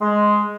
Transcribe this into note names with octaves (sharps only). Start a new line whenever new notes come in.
G#3